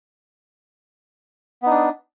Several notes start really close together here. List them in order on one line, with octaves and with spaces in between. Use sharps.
B3 D#4 D4